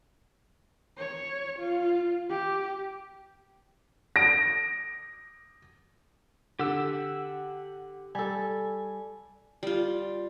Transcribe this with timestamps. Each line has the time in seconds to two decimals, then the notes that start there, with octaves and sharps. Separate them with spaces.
0.97 C#5
1.59 F4
2.29 G4
4.16 A#6 D7
6.59 D3 G4 F#5 E6
8.15 G3 A4 G#5
9.63 G3 F4